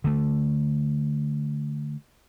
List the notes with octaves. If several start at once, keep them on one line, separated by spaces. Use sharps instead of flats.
D3 A3